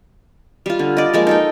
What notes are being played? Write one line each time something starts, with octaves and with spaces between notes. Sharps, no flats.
G3 F4
D3
D5 D#5
F3 G#3 A#3
D#4 A4 G5